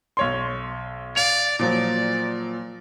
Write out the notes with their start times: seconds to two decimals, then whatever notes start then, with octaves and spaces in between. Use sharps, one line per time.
0.17 B1 C#5 C6
1.16 D5 F5 F7
1.59 A#2 F3 F#3 D5